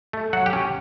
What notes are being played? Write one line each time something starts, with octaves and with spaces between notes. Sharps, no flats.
A3
F#3 F#4 F#5
G4 G5
C#4